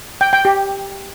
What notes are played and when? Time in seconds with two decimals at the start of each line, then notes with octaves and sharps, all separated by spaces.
0.21 G5
0.33 G5
0.45 G4